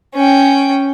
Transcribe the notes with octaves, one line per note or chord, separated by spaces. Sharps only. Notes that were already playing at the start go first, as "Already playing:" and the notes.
C#4 G5